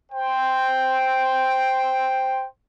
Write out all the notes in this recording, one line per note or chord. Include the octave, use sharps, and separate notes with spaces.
C5 G5